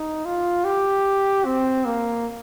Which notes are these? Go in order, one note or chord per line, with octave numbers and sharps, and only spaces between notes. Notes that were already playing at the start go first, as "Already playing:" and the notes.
Already playing: D#4
F4
G4
C4
A#3